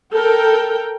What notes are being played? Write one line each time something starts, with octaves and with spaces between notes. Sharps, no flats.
A4 A#4 G5